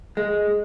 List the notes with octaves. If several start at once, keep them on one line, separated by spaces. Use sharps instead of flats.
G#3